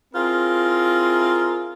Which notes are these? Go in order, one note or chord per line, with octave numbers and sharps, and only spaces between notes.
C4 E4 F4 G#4 A#4